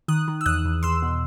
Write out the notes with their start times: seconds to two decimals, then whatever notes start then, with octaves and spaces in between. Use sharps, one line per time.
0.08 D#3 D#6 F#6
0.28 D#3
0.41 E6
0.46 E2 D#6 F#6
0.65 E2
0.83 E2 C6 E6
1.02 B2